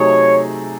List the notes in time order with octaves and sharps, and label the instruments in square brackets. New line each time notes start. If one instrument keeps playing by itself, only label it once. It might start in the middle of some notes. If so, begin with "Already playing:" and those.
Already playing: [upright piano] C3 F#3 A3 D#4 G#4 [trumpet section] C#5